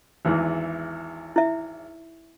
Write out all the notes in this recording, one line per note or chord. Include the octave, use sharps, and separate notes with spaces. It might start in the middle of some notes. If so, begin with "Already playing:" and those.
G#1 E2 E3
E4 E5